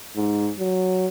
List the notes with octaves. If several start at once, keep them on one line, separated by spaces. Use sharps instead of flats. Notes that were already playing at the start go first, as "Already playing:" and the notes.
G#2
F#3